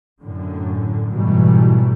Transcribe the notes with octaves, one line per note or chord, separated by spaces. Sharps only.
F#2 A2 D3
G#2 B2 E3 F#3 G3 A3